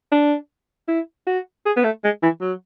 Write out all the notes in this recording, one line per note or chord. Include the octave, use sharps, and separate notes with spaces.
D4
E4
F#4
G#4
B3
A3
G#3
E3
F#3